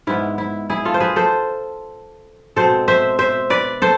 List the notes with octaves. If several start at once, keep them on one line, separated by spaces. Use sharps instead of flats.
G#2 G#3 B3 E4
E4
E4 G#4
F4 A4
C5
G#4 B4
A4 C5
B2 G#3 C4 A4 C5
C5 E5
C5 E5
B4 D5
A4 C5